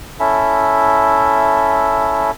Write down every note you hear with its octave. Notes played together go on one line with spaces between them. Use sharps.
C#4 E4 A4 E5